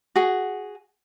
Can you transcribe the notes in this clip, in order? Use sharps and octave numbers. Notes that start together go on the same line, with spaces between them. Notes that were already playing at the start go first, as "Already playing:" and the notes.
F#4 G#4